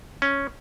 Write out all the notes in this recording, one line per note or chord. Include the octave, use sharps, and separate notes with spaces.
C#4